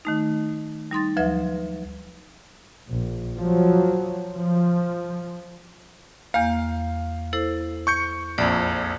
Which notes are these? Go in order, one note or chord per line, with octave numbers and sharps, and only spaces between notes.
D#3 A3 D#4
G3 D#4 C6 A6
D2 F3 F#3 B4 E5
A#1
F3 F#3
F3
E2 A#3 F5
E4 A4 C5
C#6 G6 C#7
A#1 F2 D5